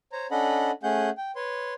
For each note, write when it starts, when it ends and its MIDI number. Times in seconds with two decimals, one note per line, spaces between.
0.12 0.27 72
0.12 0.27 73
0.12 0.27 82
0.31 0.71 61
0.31 0.71 62
0.31 0.71 69
0.31 0.71 75
0.31 0.71 78
0.31 0.71 83
0.83 1.10 57
0.83 1.10 61
0.83 1.10 68
0.83 1.10 78
0.83 1.10 91
1.17 1.31 79
1.36 1.74 71
1.36 1.74 73
1.36 1.74 84